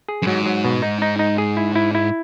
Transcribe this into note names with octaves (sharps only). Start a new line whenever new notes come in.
G#4
F#2
G#2 F#3
F#3
B2
D#4
D#4
D#4
G#4
E4
E4
E4